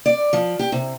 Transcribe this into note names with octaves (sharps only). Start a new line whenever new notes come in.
D5
F3
G4
C3